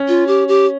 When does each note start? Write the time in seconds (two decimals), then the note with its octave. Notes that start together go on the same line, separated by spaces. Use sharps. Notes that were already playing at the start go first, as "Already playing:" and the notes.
Already playing: C#4
0.08 F4
0.27 G4
0.48 G4